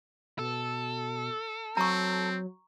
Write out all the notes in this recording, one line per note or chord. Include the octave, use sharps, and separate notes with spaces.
B2 A4
F#3 C4 A#5 C#6